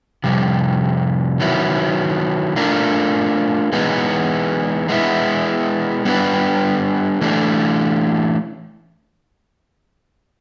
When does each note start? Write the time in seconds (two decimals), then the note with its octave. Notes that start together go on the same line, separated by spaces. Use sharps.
0.24 F2 C3 G3
1.40 D#3 F#3 B3 E4
2.56 A3 D4 F4 A#4
3.72 E3 G#3 B3 D#4
4.89 G#3 B3 E4
6.05 G3 B3 D4 G4 B4
7.21 E3 A3 D4